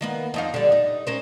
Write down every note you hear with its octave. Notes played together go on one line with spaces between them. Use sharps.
D#3 A#3 B3
F2 D#4 F5
D3 G3
D#4
C#4 A#4 C5